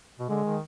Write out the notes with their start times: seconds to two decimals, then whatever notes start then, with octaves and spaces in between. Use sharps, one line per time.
0.19 B2
0.29 D3 G#3
0.45 D#3